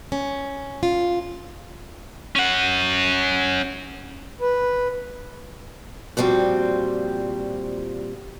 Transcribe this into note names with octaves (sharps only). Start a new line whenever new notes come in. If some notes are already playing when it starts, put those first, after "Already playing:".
C#4
F4
C#4 F#5
B4
A#2 F3 G3 C4 F#4